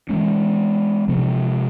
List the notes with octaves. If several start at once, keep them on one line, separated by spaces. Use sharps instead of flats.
E3 G#3 C#4
C3 F3 G#3 C4